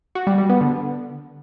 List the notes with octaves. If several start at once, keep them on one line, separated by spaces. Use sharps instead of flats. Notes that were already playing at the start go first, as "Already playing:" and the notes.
F#4
G3
G3
B3
D3